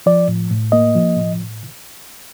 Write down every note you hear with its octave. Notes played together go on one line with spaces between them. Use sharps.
F3 D5
A2
A2
A#3 D#5
F3
A2